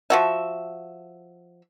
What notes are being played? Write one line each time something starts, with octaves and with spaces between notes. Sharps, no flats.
F3 F#4 E5